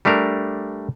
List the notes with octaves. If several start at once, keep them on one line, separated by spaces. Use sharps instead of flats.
G3 A3 D4 A#4